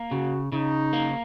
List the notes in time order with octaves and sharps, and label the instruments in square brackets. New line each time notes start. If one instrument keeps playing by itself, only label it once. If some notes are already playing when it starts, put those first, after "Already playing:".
Already playing: [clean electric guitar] A#3
[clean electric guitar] C#3 [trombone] F#4
[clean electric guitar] C#3 [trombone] D#4
[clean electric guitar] A#3